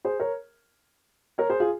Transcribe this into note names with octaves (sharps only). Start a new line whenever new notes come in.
G#4 C5
A#4 C#5
A#4 C#5
G#4 C5
F4 G#4